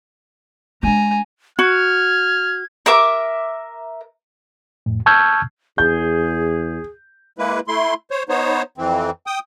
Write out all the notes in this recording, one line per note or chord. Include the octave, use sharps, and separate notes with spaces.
G#3 D4 G#5 A#5
F#4 F6 G#6
A#4 E5 D6
F2 A2
A5 C#6 E6 F6 G6 G#6
E2 G#4 G6
G#3 A#3 E4 B4
A3 E4 C6
C5 C#5
B3 D#4 C5 C#5
F2 E3 C4
G5 D#6